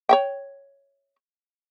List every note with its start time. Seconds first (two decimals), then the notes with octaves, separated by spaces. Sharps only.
0.09 C#5 E5 G5